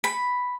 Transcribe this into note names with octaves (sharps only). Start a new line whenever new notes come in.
B5